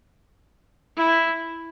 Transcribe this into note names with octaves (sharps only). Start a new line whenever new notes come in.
E4